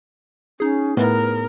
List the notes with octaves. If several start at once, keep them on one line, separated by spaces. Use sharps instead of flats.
C#4 D#4 G#4
A2 B3 A#4 B4